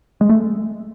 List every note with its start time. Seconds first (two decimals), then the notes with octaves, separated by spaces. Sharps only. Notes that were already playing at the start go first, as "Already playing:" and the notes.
0.21 G#3
0.29 A3